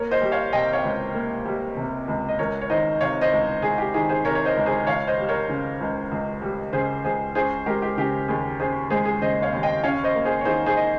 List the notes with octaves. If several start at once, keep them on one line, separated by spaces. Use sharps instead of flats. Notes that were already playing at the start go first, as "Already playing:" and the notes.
Already playing: A#3 A#4 C#5
C5 D#5
G3
C#5 F5
C3 D#5 G5
C#5 F5
C#2
A#3
G3
C3
C#2
D#5
C#2 A#4 C#5
C#5
D#3 C5 D#5
C3 C#5 F5
C5 D#5
C#2
C#2 G#4
G4
D#3 G#4
G#4 C5
C3 A#4 C#5
C#5
C5 D#5
C#2
G#4 C5
C#2 C#5 F5
C5 D#5
G3
A#4 C#5
C#3
C#2
C#2
G3
C#3 G#4 C5
C#2 G#4 C5
C#4 G#4 C5
G#3 G4 A#4
G4
C#3 G4
D#2 G#4
C#4 G#4 C5
G#3 G#4 C5
G#4
C#3 C5 D#5
C#5 F5
D#2
D#5 G5
C#4 C#5 F5
C5 D#5
A#3
G#4 C5
C#5
D#3 G#4 C5
G#4 C5
D#5